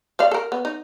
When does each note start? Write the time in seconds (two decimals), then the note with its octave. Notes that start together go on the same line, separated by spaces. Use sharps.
0.19 G#3 D5 F5
0.31 A4 A#4
0.52 B3
0.65 D#4